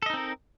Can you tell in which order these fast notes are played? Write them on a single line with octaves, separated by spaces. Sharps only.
A4 D#5 D#4 C4 A#4